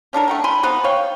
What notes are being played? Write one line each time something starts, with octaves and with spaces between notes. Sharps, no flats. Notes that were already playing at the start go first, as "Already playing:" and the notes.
C#4 D4 A4 A#4
A3 F#5 G5
G#5 B5 C6
B3 D#4 B4 C5
C#5 F5 G5